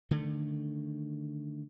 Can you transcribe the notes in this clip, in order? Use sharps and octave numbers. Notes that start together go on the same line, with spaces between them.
D3 D#3 A3